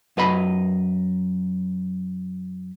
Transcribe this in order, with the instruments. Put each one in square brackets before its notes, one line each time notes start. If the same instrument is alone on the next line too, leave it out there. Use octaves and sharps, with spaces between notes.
[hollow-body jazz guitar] F#2 B4 D#5 B5